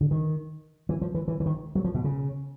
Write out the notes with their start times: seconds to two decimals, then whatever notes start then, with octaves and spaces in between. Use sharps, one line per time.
0.01 D3
0.11 D#3
0.89 E3
1.02 F3
1.15 E3
1.28 E3
1.40 E3
1.46 D#3
1.75 F#3
1.84 F3
1.94 B2
2.04 C#3